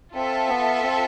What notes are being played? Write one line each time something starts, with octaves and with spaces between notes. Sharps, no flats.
C4 F4 A4 E5 A5
B3
C4